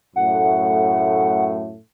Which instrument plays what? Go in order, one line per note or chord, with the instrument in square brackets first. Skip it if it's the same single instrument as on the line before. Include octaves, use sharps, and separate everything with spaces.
[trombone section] F#2 A2 A3 [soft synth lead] F#5